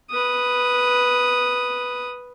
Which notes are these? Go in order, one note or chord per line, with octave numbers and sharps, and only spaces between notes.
B4 D#6